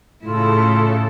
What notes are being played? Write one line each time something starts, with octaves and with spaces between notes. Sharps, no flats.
A2 C#3 E4 F4 A4